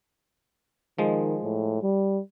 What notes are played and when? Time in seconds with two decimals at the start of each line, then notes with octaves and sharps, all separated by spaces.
0.98 D#3 F3 G#3
1.44 A2
1.83 G3